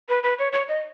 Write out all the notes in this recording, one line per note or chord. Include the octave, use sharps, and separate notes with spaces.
B4
B4
C#5
C#5
D#5